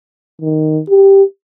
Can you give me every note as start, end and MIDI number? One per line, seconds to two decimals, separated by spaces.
0.42 0.80 51
0.89 1.23 67